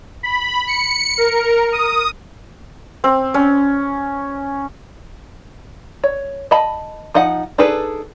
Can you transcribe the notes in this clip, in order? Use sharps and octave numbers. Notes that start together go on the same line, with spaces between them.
B5
C#7
A#4
D#6
C4
C#4
C#5
D#5 A5 B5
F3 D#4 D#5 F#5
D4 D#4 G#4 A4 B4